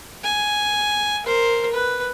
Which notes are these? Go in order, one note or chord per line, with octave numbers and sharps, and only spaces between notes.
G#5
A#4 C5
B4